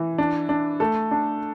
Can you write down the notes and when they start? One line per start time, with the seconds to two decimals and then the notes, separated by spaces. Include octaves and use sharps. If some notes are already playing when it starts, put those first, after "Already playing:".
Already playing: E3
0.18 D4
0.49 D4
0.80 A3 A4
1.11 D4